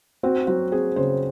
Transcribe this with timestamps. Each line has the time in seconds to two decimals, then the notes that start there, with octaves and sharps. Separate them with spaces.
0.23 C4 F#4
0.47 F#3 F#4
0.72 C4 G#4
0.96 C#3 C5